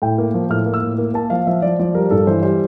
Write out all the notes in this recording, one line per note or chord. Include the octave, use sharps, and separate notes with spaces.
A2 G5
A#3
F3
A2 F6
A#3
E6
A2
A#3
A#3 A5
F3 F5
F3 E5
F3 D5
F3 D5
G3 A#4
G2 A4
E3 C5
G3 C5